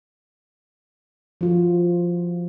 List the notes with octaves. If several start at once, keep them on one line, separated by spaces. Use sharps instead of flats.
F3 F4 F#4